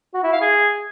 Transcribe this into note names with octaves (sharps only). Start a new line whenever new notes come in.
F#4
E4
F5
G#4